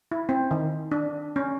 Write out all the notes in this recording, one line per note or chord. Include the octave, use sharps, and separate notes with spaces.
E4
C4
D#3
D4
C#4